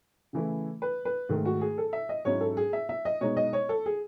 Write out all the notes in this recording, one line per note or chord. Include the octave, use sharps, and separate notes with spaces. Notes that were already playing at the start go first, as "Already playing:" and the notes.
C#3 E3 A3 E4
B4
B4
G#2 D#3 A3
F#4
G#4
A4
E5
D#5
G#2 F#3 C#4 E4 C#5
A4
G#4
E5
E5
D#5
B2 G#3 D#4 C#5
D#5
C#5
A4
G#4